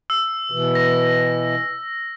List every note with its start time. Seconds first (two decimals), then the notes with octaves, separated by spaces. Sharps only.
0.10 E6
0.52 B2 E3
0.75 A#6